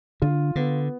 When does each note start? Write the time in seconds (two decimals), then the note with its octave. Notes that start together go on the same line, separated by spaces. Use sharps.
0.22 D3 F4
0.56 D3 B3